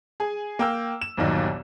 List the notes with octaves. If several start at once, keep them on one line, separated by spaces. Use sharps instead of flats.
G#4 G#5
A#3 G5 E6
E7
G1 D#2 A#2 D#3 F#3